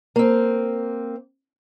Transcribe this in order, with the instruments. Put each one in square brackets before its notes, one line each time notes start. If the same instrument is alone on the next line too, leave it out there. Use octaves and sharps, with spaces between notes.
[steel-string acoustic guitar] A#3 C4